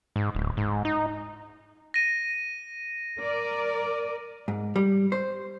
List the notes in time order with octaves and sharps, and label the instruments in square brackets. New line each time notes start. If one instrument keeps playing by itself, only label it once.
[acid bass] G#2
D1
G#2
D#4
[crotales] A#6 D#7
[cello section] A#4 D5
[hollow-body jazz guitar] G#2
G3
C5